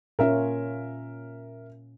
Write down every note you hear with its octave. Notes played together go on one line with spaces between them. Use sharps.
A#2 C#4 F4 A#4 E5